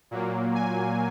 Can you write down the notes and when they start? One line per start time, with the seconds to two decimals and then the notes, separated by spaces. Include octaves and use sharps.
0.11 A#2 F#3 A#3
0.55 G#5